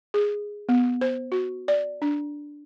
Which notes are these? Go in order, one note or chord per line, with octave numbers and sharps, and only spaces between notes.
G#4
B3
C5
F#4
D5
D4